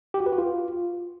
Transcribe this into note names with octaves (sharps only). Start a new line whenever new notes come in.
G4
F#4
B4
F#4
F4